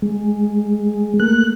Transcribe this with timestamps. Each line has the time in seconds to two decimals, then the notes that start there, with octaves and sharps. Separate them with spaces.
0.02 G#3
1.20 A3 A#3 F#6